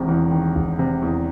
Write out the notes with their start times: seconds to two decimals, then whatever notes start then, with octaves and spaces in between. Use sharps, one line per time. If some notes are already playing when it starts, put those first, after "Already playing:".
Already playing: E1 C3 D#3
0.08 E2
0.32 D#3
0.56 E1
0.79 C3
1.02 E2